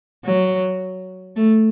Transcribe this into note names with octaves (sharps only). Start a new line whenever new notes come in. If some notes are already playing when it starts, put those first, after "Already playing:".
F#3
A3